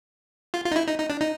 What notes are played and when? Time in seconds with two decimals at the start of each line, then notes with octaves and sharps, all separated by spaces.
0.54 F4
0.65 F4
0.72 D#4
0.76 E4
0.87 D#4
0.99 D#4
1.10 D4
1.21 D#4